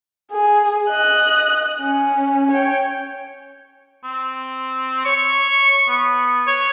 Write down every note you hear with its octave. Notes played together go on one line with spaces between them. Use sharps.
G#4
D#5 F#6
C#4
C#5 G5
C4
C#5 C#6
B3
C#5